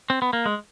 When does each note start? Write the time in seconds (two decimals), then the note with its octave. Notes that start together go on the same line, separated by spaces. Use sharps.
0.10 C4
0.22 B3
0.33 A#3
0.46 G#3